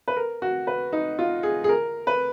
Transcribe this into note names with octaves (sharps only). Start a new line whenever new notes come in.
B4
A#4
F#4
B4
D#4
F4
G#4
G#4
A#4
B4